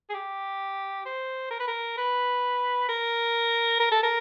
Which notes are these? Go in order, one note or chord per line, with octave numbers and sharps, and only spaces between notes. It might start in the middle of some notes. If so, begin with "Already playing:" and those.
G#4
G4
C5
A#4
B4
A#4
B4
A#4
A#4
A4
A#4